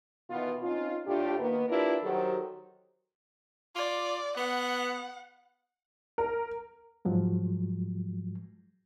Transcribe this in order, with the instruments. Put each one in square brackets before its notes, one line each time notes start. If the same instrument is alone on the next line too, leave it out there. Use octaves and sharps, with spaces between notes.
[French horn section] B2 D#3 E3 B3 F4
C4 C#4 D#4 F4
A2 D4 F4 G4
D#3 A#3 B3
D4 E4 F4 G4 A#4 B4
D#3 F#3 F#4 G4 A4 C5
[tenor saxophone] F4 [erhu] D5
[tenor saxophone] B3 [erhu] F#5
[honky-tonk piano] A#4
[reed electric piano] G#2 F3 F#3 G#3